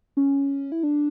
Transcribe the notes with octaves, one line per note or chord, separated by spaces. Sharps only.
C#4
E4
D4